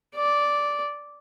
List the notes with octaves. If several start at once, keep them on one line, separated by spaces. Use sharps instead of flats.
D5